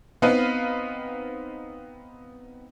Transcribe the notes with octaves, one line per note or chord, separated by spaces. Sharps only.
B3 C4 D#4 B4 D#5 F5